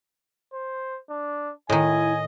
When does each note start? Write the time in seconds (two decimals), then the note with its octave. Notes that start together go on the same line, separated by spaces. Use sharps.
0.53 C5
1.10 D4
1.70 A2 D#3 E4 D#5 G#5